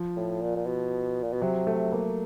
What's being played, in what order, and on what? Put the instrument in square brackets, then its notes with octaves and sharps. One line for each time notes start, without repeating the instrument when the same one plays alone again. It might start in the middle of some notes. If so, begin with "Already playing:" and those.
Already playing: [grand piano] F3
[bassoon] A2
A#2
A#2
B2
A#2
B2
[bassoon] C3 [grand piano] F#3
[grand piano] A3
A#3